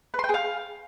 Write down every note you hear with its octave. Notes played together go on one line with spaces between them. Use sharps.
B4
C6
G5
G#4
F5